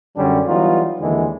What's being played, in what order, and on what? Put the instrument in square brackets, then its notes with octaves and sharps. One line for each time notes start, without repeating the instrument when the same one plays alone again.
[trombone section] F#2 D3 G3 C#4 D4
E3 F#3 G3 B3 D#4 F4
D#2 D3 E3 G#3